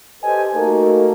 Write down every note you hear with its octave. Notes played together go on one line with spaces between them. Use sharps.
G4 A4 B4 C5 D#5 G#5
A3 A#3 D#4 F#4 A4 A#4